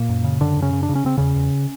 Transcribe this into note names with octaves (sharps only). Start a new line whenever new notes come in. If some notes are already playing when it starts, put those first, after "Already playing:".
Already playing: A#2 A#3
F#2
C#3
F#2 D3 D4
F#2
C#3 C#4
C#3
D4
C#3
C#4
C#3 C4
E2 C#3 C#4
E2